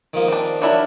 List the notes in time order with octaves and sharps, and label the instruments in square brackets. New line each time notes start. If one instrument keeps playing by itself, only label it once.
[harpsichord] D#3 F3 A#3
[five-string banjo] C4 D4
[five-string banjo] F#3 E4 A#4 [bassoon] D4